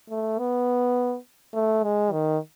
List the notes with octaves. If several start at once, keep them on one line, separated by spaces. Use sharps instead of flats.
A3
B3
A3
G#3
D#3